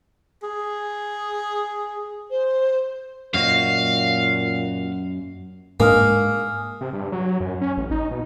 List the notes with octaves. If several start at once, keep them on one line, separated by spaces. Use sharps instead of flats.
G#4
C5
F#2 A#2 F#4 D#5 F5
G#2 G#3 A#3 D4 G#5 D#6 F6
C3
G2
F#3
F#2
C#4
A1
D#4
B2